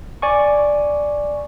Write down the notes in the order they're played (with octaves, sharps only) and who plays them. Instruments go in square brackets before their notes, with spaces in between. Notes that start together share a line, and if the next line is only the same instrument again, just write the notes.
[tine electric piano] D5 G#5 C#6